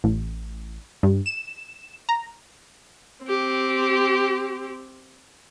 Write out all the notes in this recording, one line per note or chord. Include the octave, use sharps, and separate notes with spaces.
A1
G2
E7
A#5
C4 G4